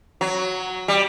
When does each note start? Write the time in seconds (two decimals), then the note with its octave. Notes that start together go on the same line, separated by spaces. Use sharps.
0.21 F#3
0.88 G3